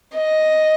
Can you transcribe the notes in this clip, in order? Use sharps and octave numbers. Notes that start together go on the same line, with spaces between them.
D#5